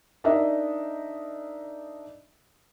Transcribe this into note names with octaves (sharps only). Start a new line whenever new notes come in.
D4 D#4 A#4 D#5 E5